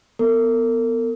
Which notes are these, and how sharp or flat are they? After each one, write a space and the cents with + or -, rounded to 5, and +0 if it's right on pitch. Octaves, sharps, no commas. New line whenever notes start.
B3 +0 A#4 -45